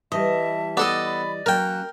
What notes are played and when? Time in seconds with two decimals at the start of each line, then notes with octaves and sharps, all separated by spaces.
0.12 E3 G3 D#5 E5 A5
0.77 B3 A4 D5 D#5
1.03 B5
1.46 F#3 A#3 C#4 A#4 G5 F#6